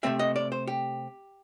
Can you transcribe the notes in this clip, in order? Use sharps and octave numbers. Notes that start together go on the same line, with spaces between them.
C3 E3 A3 C4 E5
D#5
D5
C5
G4